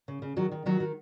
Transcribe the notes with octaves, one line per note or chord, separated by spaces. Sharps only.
C#3
C#3
D#3 F#3 F#4
D#3
D#3 F#3 F#4
D#3